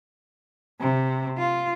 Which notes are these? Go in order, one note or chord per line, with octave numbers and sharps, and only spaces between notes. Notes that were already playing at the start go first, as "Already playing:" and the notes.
C3
F4